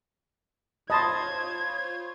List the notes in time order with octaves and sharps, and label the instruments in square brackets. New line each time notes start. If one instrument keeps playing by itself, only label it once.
[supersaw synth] F4 C5 C#5 [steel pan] D#5 A5 [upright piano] B5 C6 [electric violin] G#6